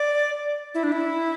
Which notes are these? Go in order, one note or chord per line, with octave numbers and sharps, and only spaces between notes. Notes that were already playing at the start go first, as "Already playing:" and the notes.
Already playing: D5
E4
D4
E4